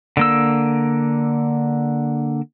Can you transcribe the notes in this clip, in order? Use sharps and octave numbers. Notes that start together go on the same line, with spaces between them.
D3 A#3 E6